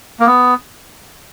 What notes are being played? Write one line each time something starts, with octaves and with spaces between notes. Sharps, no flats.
A#3
B3